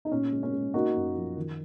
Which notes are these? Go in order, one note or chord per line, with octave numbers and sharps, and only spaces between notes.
D#4
A#2 C#4
G#3
C#4
G#3
A#3 D#4 F#4
F#2
F3
D#3